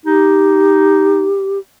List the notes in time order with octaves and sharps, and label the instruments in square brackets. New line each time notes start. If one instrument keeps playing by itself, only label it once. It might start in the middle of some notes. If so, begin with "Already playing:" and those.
[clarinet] D#4 [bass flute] G4